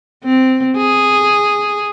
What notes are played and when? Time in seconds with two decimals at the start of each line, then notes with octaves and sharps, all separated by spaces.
0.24 C4
0.77 G#4